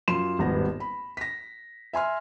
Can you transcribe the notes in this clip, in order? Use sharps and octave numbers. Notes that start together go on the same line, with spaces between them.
F#2 F4 C6 E7
D#1 G#1 G2 B3 A#6
B5
A#6 B6
E5 G#5 C6 F6